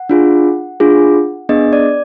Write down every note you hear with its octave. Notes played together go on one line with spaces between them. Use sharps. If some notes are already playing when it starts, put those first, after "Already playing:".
Already playing: F#5
D4 F4 G#4
D4 F4 G#4
B3 D4 G#4 D#5
D5